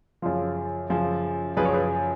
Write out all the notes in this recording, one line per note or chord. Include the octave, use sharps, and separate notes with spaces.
F#2 C#3 F3 F4
F#2 C#3 F3
F#2 C#3 F3 G#4 B4
C#5
G#4 B4